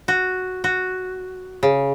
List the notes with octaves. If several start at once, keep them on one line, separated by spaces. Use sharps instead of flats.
F#4
F#4
C#3